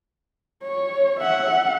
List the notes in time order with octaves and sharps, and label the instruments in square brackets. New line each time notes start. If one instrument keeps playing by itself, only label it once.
[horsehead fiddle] C#5
E5 F#5